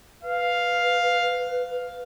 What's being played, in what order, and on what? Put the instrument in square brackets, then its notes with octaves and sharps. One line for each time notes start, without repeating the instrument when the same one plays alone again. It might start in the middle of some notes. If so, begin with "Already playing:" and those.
[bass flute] B4 [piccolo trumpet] F5